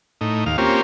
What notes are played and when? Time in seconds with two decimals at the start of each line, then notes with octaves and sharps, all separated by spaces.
0.21 A2 D#4
0.46 D#2 F5
0.58 A#3 C4 C#4 F4 G4